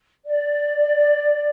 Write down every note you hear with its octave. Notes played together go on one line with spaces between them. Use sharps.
D5